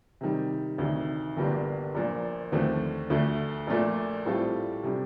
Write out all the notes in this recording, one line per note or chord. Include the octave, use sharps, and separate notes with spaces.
C3 D#3 G3
D2 C3 D#3
G1 G2 D3 G3 A#3
A#1 A#2 F3
D#2 D3 F3 A3 C4
D2 D3 A3
A#1 A#2 A3
A2 G3 C4 F4 A4
C3 G3 D4